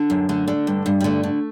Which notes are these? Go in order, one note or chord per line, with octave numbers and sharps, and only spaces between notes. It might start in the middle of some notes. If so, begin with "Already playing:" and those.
Already playing: D3
F#2
D3 A3
D3
G2
G2
G3
D3 A3
D3